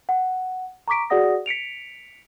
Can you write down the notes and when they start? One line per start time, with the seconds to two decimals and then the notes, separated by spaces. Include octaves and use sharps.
0.09 F#5
0.88 A#5 C#6 D6 B6 D7
1.10 F#4 G#4 D5 F#5 D#6 A#6
1.46 B6 C#7 D7 F7